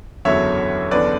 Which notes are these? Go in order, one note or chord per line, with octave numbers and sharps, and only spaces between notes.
F#1 E2 D3 F#3 C#5 E5
F#1 E2 D3 B4 D5